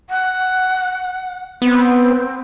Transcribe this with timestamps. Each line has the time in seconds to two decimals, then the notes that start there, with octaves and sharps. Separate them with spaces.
0.10 F#5
1.62 B3 C4